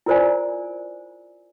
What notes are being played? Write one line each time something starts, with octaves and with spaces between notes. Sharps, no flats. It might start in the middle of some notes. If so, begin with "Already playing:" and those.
E4 F4 A#4 C5 D5 G#5